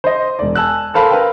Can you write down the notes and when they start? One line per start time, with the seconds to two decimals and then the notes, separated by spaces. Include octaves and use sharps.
0.04 C5 D#5
0.39 E1 D5
0.55 G#5 A5 E6 F#6
0.94 A4 A#4 C5 F5 A5 B5
1.10 A#4 B4 F5 G5